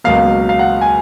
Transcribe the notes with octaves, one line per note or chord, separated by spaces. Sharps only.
C#2 B2 F#3 A#3 F5
F5
F#5
G#5